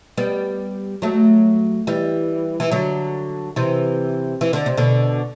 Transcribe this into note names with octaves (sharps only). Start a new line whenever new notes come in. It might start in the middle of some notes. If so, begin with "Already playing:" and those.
G3 B3
F#3 A3
E3 G3
E3
D3 F#3
C3 E3
E3
D3
C3
B2 D3